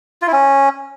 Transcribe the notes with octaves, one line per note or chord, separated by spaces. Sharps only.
F4
E4
C#4